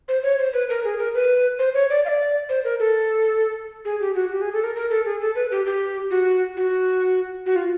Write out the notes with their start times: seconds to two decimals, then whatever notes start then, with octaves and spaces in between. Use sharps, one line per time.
0.08 C5
0.23 C#5
0.38 C5
0.53 B4
0.69 A#4
0.85 G#4
0.99 A#4
1.15 B4
1.59 C5
1.74 C#5
1.90 D5
2.05 F5
2.09 D5
2.49 C5
2.64 A#4
2.79 A4
3.85 G#4
4.00 G4
4.15 F#4
4.31 G4
4.41 G#4
4.53 A4
4.64 A#4
4.76 A#4
4.90 A4
5.05 G#4
5.21 A4
5.35 B4
5.51 G4
5.66 G4
6.11 F#4
6.57 F#4
7.46 F#4
7.56 F4